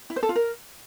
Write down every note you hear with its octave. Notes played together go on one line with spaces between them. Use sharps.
E4
C5
A4
F4
A#4